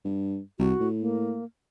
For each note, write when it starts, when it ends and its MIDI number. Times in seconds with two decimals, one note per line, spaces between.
0.05 0.40 43
0.59 0.74 36
0.59 0.88 66
0.80 1.41 45
1.00 1.44 58